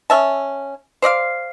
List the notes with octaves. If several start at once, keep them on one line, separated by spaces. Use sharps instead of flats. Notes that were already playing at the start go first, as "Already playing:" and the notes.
C#4 E5 A5
C5 D5 D#5 F5